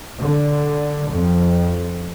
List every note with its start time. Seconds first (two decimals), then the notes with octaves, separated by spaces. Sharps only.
0.20 D3
1.12 F2